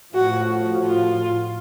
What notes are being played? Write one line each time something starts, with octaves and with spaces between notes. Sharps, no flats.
A2 F3 F#4
F4